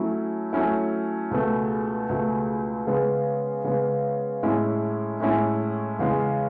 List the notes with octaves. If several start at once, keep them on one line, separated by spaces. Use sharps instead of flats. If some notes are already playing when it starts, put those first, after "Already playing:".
Already playing: F#3 A3 C#4 E4
F#3 A3 C#4 E4
C#2 B2 A3
C#2 B2 A3
C#3 G#3 B3
C#3 G#3 B3
A2 G#3 C#4 E4
A2 G#3 C#4 E4
E2 C#3 G#3